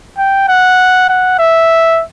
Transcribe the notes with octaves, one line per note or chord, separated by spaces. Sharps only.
G5
F#5
F#5
E5